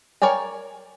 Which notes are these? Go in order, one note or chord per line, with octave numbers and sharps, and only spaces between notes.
A#4 C#5 D5 G5 G#5